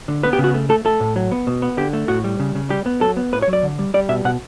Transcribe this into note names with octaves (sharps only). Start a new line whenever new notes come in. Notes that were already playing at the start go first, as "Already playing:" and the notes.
D3
B3 B4
G4
C#3
F#4
A3
A3 A4
A3 A4
A2
F#3
B3
B2
B3
D3 G4
A3
A2 F#4
G3
C#3
C#3
G3 G4
B3
F#3 A4
B3
A2 B4
C#5
F#3
D5
D3
G3
G3 D5
B2 E5
B2 F#5